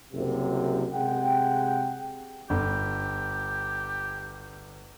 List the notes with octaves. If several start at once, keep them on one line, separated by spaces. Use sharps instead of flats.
F#1 C2 F#2 C3
C3 G#3 F#5 G5
G1 G4